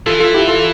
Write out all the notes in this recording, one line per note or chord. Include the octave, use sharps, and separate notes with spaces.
E3 F4 A4
F4 A4
E4 G4
F4 A4